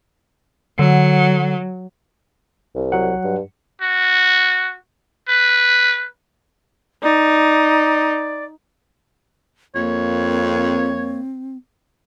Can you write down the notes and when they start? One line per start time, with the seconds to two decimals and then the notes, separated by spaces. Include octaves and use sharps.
0.79 D3 F#3
2.75 C2
2.92 F#3 F#5
3.24 G2
3.81 F#4
5.28 B4
7.03 D#4 D5
9.75 F2 A#3 C#5
10.31 C4